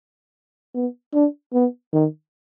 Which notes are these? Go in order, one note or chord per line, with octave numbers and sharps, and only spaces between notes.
B3
D4
B3
D#3